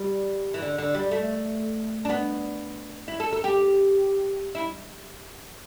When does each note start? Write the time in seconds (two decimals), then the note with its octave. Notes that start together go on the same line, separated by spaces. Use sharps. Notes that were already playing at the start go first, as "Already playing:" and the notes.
Already playing: G3
0.54 E3
0.62 D3
0.78 D3
0.95 G3
1.11 A3
2.05 D4
2.10 B3
3.08 E4
3.20 A4
3.32 A4
3.44 G4
4.55 E4